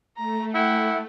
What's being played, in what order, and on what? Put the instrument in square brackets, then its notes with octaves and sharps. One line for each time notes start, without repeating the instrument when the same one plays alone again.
[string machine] A3 [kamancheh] A#5
[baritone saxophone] E4 [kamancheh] F#5 G5